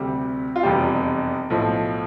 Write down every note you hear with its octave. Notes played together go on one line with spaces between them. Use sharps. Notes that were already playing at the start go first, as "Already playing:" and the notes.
Already playing: D2 C3 G3
F4
F1 E2 B2 G3 G4
B1 A2 F3